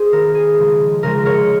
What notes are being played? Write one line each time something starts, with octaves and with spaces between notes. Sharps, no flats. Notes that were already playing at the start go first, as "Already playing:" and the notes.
Already playing: G#4 C5
D#3 A#3 A#4
G#4
C#3 F3 G#3
C#3 F3 G#3 A#4
A#4 C#5